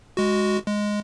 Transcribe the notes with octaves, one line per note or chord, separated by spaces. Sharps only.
G#3 F#4
G#3